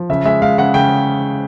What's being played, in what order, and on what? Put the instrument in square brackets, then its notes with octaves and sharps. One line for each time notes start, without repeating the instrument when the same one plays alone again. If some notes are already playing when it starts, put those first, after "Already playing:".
Already playing: [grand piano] F3
C#3 E5
G#3 E5
G#3 F5
C#3 F#5
C#3 G5